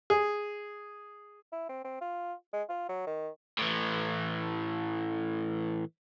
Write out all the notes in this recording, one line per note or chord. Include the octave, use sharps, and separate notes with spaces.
G#4
E4
C4
C4
F4
G#3
F4
F#3
D#3
A2 E3